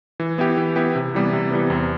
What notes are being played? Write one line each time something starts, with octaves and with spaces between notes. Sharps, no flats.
E3
B3 E4 G4
E3
B3 E4 G4
C3
E3 G3 B3
C3
E3 G3 B3
E2